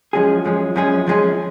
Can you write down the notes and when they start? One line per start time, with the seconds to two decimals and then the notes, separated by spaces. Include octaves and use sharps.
0.13 F#2 F3 G#3 C#4 G#4
0.45 F#2 F3 G#3 C#4 G#4
0.76 F#2 F3 G#3 C#4 G#4
1.07 F#2 F3 G#3 C#4 G#4